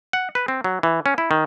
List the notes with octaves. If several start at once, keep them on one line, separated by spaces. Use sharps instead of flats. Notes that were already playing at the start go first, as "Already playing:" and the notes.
F#5
B4
C4
F#3
E3
C#4
E4
D#3